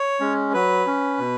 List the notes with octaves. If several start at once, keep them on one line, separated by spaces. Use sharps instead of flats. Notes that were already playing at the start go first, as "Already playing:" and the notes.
Already playing: C#5
G#3 C#4
F#3 B4
C#4
B2